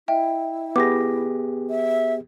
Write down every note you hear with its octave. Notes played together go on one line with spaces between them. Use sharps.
E4 D#5 E5 G5
B3 G4 G#4 D6 A#6
E5